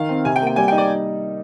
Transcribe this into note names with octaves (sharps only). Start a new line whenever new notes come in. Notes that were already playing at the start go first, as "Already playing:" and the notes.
Already playing: D#3 F5
C4
C3 G#5
G5
A#3
G5
G3 G#5
G5
D#4
D5